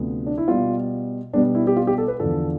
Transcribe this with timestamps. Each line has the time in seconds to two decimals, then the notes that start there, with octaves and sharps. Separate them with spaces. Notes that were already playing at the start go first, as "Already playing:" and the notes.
Already playing: D2 C3 F3 B3
0.26 D4
0.38 E4
0.48 B2 G3 B3 F4
1.33 B2 G3 B3 D4
1.55 E4
1.67 G4
1.77 F4
1.87 G4
1.98 A4
2.08 B4
2.20 E2 D3 F3 A4